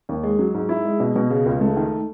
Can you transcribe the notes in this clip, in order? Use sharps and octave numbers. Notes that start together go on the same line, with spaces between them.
D#2
G#3
F#3
G#2
E4
G#3
B2
B2
C#3
C#2
A3
D#3